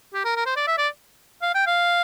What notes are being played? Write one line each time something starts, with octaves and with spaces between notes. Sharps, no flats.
G4
A#4
A#4
C5
D5
E5
D5
F5
G5
F5